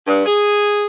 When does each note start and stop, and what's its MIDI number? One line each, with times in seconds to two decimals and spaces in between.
0.07 0.23 43
0.26 0.86 68